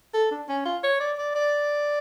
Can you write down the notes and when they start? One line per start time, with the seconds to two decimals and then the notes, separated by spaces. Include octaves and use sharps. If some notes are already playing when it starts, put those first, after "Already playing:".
0.14 A4
0.31 D4
0.49 C#4
0.65 F4
0.84 C#5
1.00 D5
1.18 D5
1.35 D5